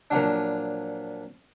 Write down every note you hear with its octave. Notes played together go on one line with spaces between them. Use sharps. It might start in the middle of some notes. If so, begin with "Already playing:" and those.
A#2 F3 F#3 D4